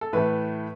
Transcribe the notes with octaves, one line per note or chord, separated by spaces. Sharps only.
A4
A2 E3 A3 B4